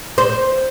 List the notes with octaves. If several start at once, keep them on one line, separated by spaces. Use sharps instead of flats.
C5